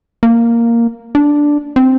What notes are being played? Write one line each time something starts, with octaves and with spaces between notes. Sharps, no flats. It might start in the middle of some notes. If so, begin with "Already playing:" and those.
A#3
D4
C4